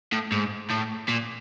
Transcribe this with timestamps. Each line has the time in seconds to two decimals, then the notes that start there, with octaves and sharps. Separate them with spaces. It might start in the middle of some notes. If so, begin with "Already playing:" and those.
0.13 A2
0.32 G#2
0.70 A2
1.08 A#2